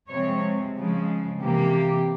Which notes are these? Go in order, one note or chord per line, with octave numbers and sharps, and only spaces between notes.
C3 F3 G#3 C4 C#5
C#3 F3 G#3
C3 E3 A#3 G4